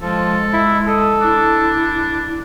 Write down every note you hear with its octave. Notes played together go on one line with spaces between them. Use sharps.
F3 G#3 A4
E4
A4 D#5
D4 E4